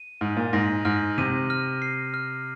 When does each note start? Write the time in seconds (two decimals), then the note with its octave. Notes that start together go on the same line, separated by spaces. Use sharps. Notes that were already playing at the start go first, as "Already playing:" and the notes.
Already playing: D#7
0.21 G#2 F6
0.37 A#2
0.53 G#2 A#6
0.85 G#2 F6
1.18 C3 D#7
1.50 F6
1.82 C7
2.14 F6